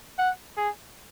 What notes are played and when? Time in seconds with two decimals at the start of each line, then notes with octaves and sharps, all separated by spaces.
0.18 F#5
0.57 G#4